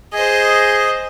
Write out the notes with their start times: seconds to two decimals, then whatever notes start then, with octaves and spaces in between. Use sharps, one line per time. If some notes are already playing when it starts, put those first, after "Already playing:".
0.13 G#4 C5 D#5